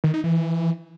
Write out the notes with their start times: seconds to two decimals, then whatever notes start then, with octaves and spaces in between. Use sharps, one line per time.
0.04 D#3
0.14 D#4
0.24 E3